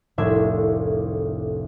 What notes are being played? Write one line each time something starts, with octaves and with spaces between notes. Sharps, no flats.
F1 C2 A2 D4 E5 G#6